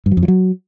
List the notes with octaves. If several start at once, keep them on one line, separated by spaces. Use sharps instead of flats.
G2
F#3
F2
F3
F#3